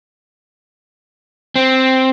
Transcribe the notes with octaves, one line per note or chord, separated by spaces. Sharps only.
C4